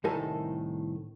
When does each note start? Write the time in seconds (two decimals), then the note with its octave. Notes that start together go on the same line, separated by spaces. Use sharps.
0.04 C2 A2 D#3 A4 A#4 G#5